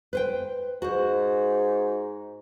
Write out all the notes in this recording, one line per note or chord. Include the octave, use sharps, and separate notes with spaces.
B4 C5 G5
G#2 F#4 C5